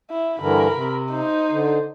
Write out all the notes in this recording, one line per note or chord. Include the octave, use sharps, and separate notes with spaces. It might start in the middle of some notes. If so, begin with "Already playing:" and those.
E4
G2 D3 E3 A#4 B5
C3
D#4 C5
D3